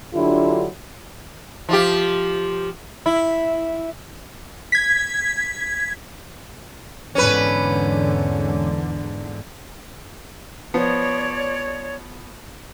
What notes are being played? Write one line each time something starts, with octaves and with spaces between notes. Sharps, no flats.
D3 F#3 D4 E4 F4 G4
F3 F4 G4
E4
G#6 B6
E2 G#2 D3 C#4 B4
F3 B3 C#5 D5